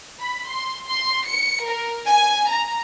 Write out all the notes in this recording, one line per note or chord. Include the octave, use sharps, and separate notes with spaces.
B5
C6
C6
C#7
A#4
G#5
A#5